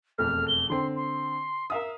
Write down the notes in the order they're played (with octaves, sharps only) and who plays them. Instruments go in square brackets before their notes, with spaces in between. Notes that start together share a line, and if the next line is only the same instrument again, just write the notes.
[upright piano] E1 F2 A3 [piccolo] F6
[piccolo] G7
[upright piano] D3 C4 [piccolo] C6
[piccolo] C6
[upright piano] A#4 F5 D#6 [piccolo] E5